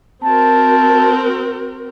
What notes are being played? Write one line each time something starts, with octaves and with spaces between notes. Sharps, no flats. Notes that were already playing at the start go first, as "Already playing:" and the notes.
C4 F#4 A#4 A5